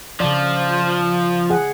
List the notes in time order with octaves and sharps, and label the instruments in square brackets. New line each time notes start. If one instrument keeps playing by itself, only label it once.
[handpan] C#3 D5 [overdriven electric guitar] F3
[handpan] G#4 F#5